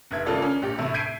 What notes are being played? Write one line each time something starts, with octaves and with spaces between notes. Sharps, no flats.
F1 E5 G#6
G#1 C#3 A#3 F4 A4 D5
C#4
A#1 G4
A2 C3 E4
G6 G#6 B6 C7 D7 D#7